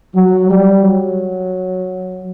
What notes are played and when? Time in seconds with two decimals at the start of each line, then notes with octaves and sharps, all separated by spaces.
0.15 F#3
0.49 G3
0.82 F#3